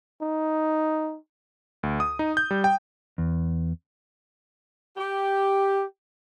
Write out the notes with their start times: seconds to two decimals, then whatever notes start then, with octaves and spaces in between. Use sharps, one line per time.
0.22 D#4
1.83 D2
2.00 D#6
2.19 D#4
2.37 G6
2.51 G3
2.64 G5
3.18 E2
4.97 G4